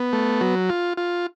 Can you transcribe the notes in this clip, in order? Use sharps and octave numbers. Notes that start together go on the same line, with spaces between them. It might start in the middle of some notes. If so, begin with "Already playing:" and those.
Already playing: B3
A3
F#3
F4
F4